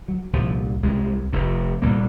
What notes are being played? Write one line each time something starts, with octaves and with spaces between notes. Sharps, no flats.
F#3
C2 A#2 F3
C2 C3 G#3
F1 F2 C3
C2 A#2 A#3